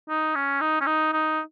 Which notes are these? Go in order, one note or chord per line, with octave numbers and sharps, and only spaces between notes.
D#4
C#4
D#4
C#4
D#4
D#4